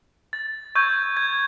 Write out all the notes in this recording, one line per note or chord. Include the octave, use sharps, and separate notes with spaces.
A6
C#6 E6 G6 G#6
G#6